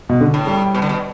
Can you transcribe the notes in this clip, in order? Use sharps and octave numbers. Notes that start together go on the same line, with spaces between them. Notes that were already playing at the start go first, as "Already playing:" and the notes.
B2
D3
A2
G3
B2
D3
B2